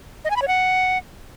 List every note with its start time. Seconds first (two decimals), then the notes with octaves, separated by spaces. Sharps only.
0.25 D#5
0.30 G#5
0.36 B5
0.42 C#5
0.48 F#5